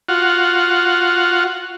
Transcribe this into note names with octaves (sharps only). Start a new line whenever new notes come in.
F4 F#4